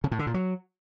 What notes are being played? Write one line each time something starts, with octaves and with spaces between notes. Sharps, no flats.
C#3
A2
D3
A#2
F#3